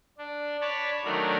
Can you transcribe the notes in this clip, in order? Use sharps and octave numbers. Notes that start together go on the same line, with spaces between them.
D4
C#5 D5 A5 B5
D#3 F#3 A3 D4 A#4